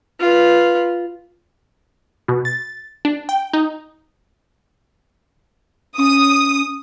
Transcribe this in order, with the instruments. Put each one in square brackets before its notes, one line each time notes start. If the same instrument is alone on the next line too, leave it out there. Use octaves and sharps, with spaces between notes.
[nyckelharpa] F4 B4
[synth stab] B2
A6
D4
G5
D#4
[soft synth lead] C#4 [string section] D#6